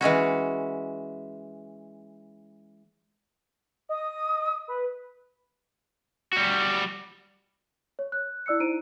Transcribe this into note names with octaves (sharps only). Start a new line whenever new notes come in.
E3 G#3 C#4 F#4
D#5 D#6
B4
G3 F#4
C#5
F#6
E4 D5 E6 F#6 C#7
D#4 E4 C5 A#5 D7 D#7